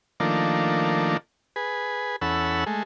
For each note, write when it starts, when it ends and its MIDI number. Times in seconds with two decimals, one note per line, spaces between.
0.20 1.17 51
0.20 1.17 53
0.20 1.17 57
0.20 1.17 58
0.20 1.17 62
1.56 2.16 68
1.56 2.16 71
2.21 2.64 40
2.21 2.64 61
2.21 2.64 69
2.21 2.64 78
2.21 2.64 83
2.21 2.64 88
2.66 2.83 56
2.66 2.83 57